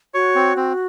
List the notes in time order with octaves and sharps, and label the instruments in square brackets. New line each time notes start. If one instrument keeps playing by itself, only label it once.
[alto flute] F#4 [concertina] C#5
[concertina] C4
C4